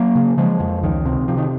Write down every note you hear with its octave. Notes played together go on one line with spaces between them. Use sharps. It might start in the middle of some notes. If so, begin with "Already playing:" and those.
Already playing: F#3 A#3
C#3
C#3 F3 G#3
F2
C#2 D#3
C3
C3 F3
D#3